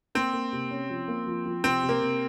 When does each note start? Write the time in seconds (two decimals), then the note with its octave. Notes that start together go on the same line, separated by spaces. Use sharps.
0.15 A#3 C4
0.33 A#3
0.53 C3
0.71 C#4
0.90 F3
1.08 A#3
1.27 F3
1.46 F3
1.64 C3 C4
1.83 C3
1.89 A#3
2.01 C3